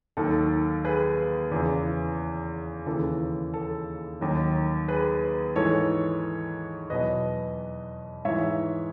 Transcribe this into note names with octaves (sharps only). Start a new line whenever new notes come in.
D#2 D#3 F#3 A4
G#4 B4
E2 C#3 E3
D#2 C#3 E3 A4
A4
D#2 D#3 F#3
G#4 B4
G#2 E3 A4 C#5
E2 B2 F#3 B4 D#5
G#2 E3 C#5 E5